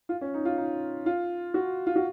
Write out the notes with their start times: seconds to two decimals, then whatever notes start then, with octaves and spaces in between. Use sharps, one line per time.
0.09 F4
0.21 C#4
0.34 D#4
0.45 F4
0.57 D#4
1.06 F4
1.54 F#4
1.87 F4
1.96 F#4